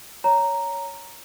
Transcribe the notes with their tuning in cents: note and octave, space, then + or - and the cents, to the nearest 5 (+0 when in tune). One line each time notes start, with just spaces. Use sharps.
C#5 +10 A#5 -5